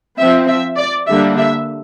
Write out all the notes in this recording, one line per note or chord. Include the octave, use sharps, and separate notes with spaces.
F3 C4 E5
E5
D5
D3 G3 A#3 D4 E5
E5